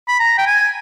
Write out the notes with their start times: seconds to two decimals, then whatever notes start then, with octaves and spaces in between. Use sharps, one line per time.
0.08 B5
0.20 A#5
0.38 G5
0.46 G#5